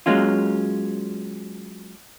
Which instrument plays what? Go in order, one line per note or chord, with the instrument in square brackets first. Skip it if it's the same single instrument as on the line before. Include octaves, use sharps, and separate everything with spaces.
[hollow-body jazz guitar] F#3 G#3 A#3 C#4 F4